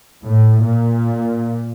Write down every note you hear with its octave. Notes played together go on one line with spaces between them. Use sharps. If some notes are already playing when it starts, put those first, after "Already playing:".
A2
A#2